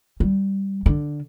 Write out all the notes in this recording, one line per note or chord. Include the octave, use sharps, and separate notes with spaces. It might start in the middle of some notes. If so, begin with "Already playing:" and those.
G3
D3